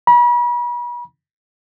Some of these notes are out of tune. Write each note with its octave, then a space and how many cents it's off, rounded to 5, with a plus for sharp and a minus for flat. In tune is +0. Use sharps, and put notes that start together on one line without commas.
B5 -40